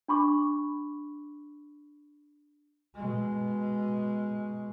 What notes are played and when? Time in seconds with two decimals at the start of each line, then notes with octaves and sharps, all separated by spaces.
0.08 D4 B5 C#6 D6
2.95 B2 G#3